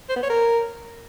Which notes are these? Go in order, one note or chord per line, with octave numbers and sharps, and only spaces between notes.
C5
B3
C#5
A#4